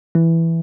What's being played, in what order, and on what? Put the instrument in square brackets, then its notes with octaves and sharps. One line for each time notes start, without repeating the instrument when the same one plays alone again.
[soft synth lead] E3